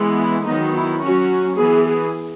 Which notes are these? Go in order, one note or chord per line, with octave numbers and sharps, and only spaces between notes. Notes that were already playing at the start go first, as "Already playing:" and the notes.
Already playing: E3 G#3 B3
E4
D#3 F#3 B3 D#4
E4
F#3 C#4 F#4
E3 B3 G#4
G#4